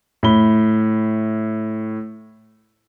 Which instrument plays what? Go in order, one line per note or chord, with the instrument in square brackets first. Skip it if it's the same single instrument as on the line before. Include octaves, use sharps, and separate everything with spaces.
[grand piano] A2 B5 G7